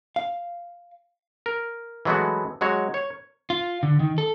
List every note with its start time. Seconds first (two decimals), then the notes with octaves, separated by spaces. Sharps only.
0.16 F5
1.46 A#4
2.05 E3 F#3 G#3 A3 B3 F#4
2.61 F#3 G#3 F#4 C#5
2.94 C#5
3.50 F4
3.83 D3
4.00 D#3
4.18 A4